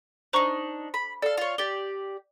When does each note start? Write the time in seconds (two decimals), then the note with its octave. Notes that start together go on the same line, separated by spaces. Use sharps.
0.33 D4 D#4 C5 A#5 C#6
0.94 B5
1.22 A4 D5 F5
1.38 F4 C#5
1.58 G4 D5 A6 G7